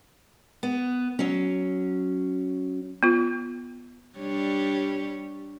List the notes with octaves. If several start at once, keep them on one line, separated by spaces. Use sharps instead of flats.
B3
F#3 C#4
B3 F4
G3 D4 C#5